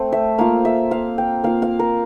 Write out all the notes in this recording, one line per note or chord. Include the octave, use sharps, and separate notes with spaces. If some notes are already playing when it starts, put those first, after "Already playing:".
Already playing: A3 C4 C5
E5
A#3 F4 F5
E5
F5
G5
A#3 F4 F5
F5
A#4